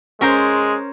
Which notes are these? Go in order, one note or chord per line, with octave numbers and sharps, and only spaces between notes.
G#3 C#4 A#4 C5